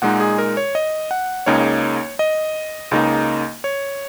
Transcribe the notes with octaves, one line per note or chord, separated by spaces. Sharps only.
A#2 G#3 D#4 F#5
G#4
A#4
C#5
D#5
F#5
C#2 C#3 A#3 D#4 C#5
D#5
C#2 C#3 A#3 D#4
C#5